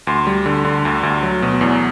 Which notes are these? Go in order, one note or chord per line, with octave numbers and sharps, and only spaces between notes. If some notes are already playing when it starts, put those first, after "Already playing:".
D2 C6
G3
D3
D3
D2
D2
F#3
B2
E2